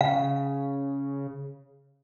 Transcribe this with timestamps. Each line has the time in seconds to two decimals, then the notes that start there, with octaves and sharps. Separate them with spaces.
0.01 C#3 F5